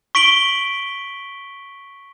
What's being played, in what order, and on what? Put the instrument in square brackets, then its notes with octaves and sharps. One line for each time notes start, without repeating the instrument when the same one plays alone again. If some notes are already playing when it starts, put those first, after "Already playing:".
[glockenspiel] C#6 B6 D7 F#7 G7